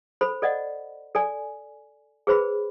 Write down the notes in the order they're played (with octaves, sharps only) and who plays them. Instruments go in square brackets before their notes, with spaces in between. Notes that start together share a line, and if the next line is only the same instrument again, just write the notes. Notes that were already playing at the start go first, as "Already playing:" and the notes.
[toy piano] A4 C5 B5
A4 D5 D#5 F#5
A4 D5 G#5
G#4 B4 C5 B5